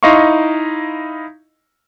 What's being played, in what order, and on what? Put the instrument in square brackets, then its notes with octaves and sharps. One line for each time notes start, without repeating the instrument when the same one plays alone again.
[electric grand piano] D#4 E4 D#5 F5 C6 C#6